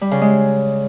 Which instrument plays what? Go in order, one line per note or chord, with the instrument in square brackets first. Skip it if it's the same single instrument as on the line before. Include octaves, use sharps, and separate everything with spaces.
[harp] G3
C#3
G#3